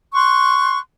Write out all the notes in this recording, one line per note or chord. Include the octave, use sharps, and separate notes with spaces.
C6 C#6 F#6